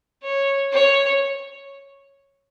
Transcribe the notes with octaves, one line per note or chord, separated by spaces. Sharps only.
C#5
C#5